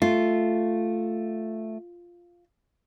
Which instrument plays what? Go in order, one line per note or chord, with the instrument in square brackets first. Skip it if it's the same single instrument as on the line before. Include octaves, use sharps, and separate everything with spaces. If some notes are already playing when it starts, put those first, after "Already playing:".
[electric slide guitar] A3 [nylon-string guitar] F4